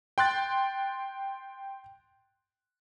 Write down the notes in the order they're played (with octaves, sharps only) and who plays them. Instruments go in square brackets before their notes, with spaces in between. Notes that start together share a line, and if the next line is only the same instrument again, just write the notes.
[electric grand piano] G5 C6 F#6 A6